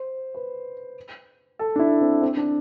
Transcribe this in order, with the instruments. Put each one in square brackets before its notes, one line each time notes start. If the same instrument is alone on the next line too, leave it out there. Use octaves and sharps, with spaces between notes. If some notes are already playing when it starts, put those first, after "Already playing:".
Already playing: [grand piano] C5
B4
A4
D4
E4
C4
C4
D4